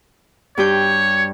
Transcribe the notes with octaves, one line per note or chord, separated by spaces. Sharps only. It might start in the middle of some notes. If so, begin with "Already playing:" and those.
G2 G4 C#5 G6